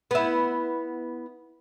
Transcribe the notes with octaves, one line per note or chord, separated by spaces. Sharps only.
B3 E4